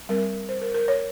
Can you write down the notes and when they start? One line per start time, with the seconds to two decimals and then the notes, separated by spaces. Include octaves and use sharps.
0.09 G3 C4 A#4
0.49 C5
0.62 A#4
0.74 A#4
0.88 C#5